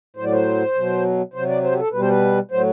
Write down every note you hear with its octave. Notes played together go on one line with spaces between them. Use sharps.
A2 F#3 C5
D5
C5
B2 F#3
C3 F#3 C5
D5
C5
G4
A4
B2 G3 B4
C5
B4
A2 F#3 C5